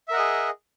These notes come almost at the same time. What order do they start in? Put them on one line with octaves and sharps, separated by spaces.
E5 A#4 F#5 D#5 G#4